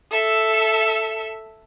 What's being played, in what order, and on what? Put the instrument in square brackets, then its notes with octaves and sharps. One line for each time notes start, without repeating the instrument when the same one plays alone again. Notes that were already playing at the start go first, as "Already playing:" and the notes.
[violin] A4 E5